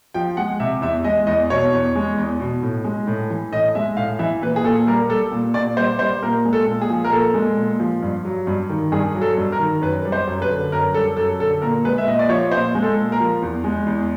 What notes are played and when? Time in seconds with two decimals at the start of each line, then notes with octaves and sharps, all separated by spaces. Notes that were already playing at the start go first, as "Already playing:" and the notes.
0.14 F3 G5
0.37 G#3 F#5
0.60 C3 E5
0.82 E2 E5
1.04 G#3 D#5
1.27 E2 D#5
1.50 B2 C#5
1.73 E2
1.95 G#3
2.17 E2
2.40 B2
2.62 A2
2.84 G#3
3.07 A2
3.30 E3
3.52 A2 D#5
3.75 G#3 E5
3.97 A2 F5
4.19 E3 E5
4.42 A#2 B4
4.56 G#4
4.64 A#2 A4
4.87 G3 A#4
5.10 G3 A4
5.32 A#2
5.54 A#2 D5
5.77 G3 C5
5.99 G3 C5
6.22 A#2 A#4
6.45 G#3
6.53 A4
6.67 A#2
6.82 G#4
6.89 F3
7.04 A#4
7.12 A#2 A4
7.34 G#3
7.57 A#2
7.80 F3
8.02 G2
8.25 F#3
8.47 G2
8.70 D#3
8.92 G2 G#4
9.15 F#3
9.22 A4
9.37 G2
9.52 A#4
9.59 D#3
9.82 F#2 B4
10.05 G3
10.12 C5
10.27 F#2
10.42 B4
10.49 D3
10.72 F#2 A#4
10.94 G3 A4
11.17 F#2 A4
11.40 D3 A4
11.61 A#2 A#4
11.85 G#3 B4
11.98 E5
12.07 A#2 D#5
12.19 D5
12.29 F3 C#5
12.51 A#2 C5
12.75 G#3
12.82 A4
12.97 A#2
13.12 A#4
13.20 F3
13.42 E2
13.64 G#3
13.86 E2